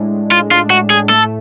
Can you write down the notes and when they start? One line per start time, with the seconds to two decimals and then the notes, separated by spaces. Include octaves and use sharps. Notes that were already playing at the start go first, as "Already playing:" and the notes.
Already playing: A2 G#3 D4
0.12 A2
0.31 G#3 F4
0.51 D4 F4
0.70 A2 F#4
0.90 A2 G#4
1.09 A3 A4